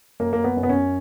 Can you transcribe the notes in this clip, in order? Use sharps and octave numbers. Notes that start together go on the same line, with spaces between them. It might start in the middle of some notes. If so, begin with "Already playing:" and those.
F#2 A#3
A#3
B3
F#2
B3
C#4